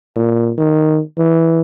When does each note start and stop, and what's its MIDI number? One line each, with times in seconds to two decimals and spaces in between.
0.16 0.52 46
0.58 1.01 51
1.18 1.61 52